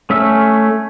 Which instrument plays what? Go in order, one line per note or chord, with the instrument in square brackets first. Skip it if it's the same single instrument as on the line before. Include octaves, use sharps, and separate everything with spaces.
[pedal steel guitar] A3 C#4 E5